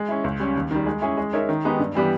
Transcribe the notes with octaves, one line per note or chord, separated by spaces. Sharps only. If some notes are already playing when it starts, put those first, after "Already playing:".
Already playing: G#3
C#4 E4
C#2
C#3 G3 C#4
D#2
D#3 G3
G#3
C#4 E4 G#4
G#3
D#4 A#4 C#5 E5
D#3
G#3 B3 D#4 G4
G2
E3 G3 B3 G4